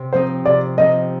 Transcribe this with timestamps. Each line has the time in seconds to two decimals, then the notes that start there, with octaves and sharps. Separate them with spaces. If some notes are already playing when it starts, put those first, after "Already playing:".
Already playing: C3
0.13 F3 C4 D#4 C5
0.45 C3 D5
0.78 F3 C4 D#4 D#5